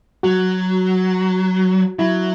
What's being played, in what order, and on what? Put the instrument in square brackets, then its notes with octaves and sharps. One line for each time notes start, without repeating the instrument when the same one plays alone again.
[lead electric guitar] F#3 [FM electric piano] F#4
[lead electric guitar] F#3 [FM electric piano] E4